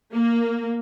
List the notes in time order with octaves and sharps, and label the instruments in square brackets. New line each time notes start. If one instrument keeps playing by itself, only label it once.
[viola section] A#3